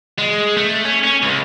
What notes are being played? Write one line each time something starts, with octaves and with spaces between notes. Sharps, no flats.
G#3
A3
C#4
C#4
C#2